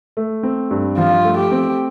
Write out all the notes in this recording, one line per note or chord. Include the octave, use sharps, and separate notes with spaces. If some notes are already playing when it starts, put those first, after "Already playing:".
A3
C4
G2
F3 F4
A3
G4
C4